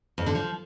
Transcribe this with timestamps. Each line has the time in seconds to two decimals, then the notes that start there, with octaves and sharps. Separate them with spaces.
0.18 F2
0.26 D3
0.35 F3